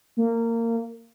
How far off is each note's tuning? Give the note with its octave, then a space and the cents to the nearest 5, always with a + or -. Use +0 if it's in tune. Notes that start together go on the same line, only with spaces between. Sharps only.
A#3 -20